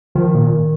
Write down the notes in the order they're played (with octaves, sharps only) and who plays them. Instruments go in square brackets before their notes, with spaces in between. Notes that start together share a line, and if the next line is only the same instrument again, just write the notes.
[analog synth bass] D#3 [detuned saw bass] F3
[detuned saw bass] A#2